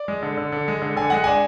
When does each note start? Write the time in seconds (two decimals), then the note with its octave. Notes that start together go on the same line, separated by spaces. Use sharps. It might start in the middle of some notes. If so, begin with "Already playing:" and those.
Already playing: D5
0.08 G#3
0.23 D3
0.37 D3
0.52 D3
0.68 G#3
0.82 D3
0.96 D3 G#5
1.10 G#3 F#5
1.24 D4 G#5